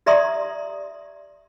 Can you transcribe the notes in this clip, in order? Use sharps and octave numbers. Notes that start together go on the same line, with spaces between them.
G4 D5 E5 A#5 C6 D#6